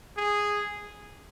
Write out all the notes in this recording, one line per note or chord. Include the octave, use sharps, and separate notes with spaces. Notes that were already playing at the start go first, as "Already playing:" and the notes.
G#4